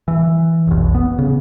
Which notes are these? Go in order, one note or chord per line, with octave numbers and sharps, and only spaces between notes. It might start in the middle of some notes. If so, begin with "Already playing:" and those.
E3
F1 B1
B3
C#3